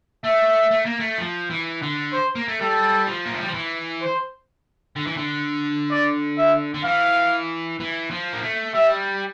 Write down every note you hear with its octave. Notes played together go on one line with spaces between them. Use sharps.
A3 E5
A3
A#3
A3
F3
E3
D3
C5
A#3
A3
G3 A4
F3
A#3
A3
G3
F3
E3
C5
D3
E3
D3
D5
E5
D3
E3 F5
E3
F3
A#3
A3
G3 E5